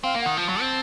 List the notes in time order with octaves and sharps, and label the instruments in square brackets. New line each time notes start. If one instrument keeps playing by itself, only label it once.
[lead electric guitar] C4 [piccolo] F5
[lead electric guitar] A#3
[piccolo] F#5
[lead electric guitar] D#3
[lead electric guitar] F3 [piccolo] A5
[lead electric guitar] F#3
C4